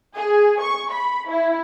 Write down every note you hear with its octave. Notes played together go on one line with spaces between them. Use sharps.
G#4
C#6
B5
E4